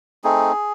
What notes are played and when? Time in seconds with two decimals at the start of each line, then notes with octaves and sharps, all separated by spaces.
0.24 A3 C4 D#4 G#4